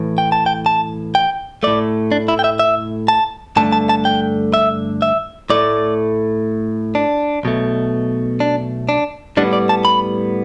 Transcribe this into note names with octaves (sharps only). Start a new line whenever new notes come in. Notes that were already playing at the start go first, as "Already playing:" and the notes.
Already playing: A2 E3
G5
A5
G5
A5
G5
A2 A3 D5
D4
E4
G5
E5
E5
A5
G2 D3 A3 A5
A5
A5
G5
E5
E5
A2 A3 D5
D4
B1 B2 A3
D4
D4
A2 G3 B3 D4
D5
A5
B5